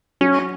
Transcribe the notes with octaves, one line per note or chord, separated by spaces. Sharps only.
F#3 C#4